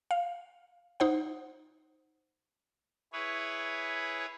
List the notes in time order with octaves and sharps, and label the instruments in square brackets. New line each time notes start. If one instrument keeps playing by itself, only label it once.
[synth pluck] F5
D#4 C5 F#5
[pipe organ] E4 G#4 B4 C#5